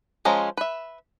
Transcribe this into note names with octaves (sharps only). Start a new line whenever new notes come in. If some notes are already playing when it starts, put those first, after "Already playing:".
F3 G#3 C#4 A#5
B4 E5